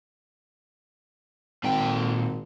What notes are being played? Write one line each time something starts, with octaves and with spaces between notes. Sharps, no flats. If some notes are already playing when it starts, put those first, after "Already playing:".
G#1 A#2 G5